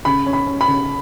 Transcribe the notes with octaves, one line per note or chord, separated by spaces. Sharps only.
C#3 B5
C#4
B5
C#4
B5
C#3